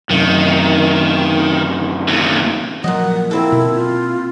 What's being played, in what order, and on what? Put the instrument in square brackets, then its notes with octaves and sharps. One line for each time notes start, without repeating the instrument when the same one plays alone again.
[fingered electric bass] F#2 C3 [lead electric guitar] D#3
[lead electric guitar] D#2 A2
[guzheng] A#2 D#5 [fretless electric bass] F3 F#3 [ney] F#5
[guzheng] A#3 C4 A4 [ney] E4
[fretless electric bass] B2
[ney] F4